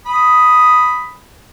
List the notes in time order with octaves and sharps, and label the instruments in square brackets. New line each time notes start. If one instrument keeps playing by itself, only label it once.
[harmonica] B5 D#6